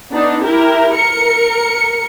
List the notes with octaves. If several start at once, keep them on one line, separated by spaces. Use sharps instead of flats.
B3 D4 D#4
E4 G4 A#4
A#4 C#7